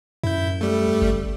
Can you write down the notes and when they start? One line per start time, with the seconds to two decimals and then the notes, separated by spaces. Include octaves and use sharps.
0.23 F#2 E4 G6
0.61 G3 A3
1.01 G1